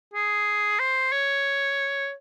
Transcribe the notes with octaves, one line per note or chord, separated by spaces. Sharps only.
G#4
C5
C#5